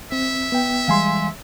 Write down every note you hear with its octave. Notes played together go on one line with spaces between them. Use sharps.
C4 E5
B3 G5
E3 G3 G#3 F5 G#5 C6